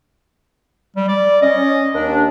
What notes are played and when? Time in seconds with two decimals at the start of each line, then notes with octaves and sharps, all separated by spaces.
0.96 G3
1.08 D5
1.42 C#4 D#5
1.93 D#2 D4